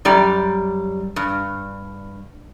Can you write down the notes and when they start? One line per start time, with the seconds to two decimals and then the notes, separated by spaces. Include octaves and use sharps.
0.05 F#2 G3 D5
1.16 G2